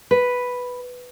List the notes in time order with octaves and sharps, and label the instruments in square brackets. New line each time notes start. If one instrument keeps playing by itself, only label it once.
[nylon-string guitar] B4